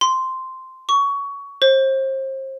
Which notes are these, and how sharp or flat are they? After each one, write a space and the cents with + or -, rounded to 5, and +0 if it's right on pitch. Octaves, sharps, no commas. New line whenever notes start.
C6 -5
C#6 +20
C5 +35